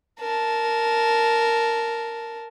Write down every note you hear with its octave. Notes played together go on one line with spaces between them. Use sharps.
A#4 A5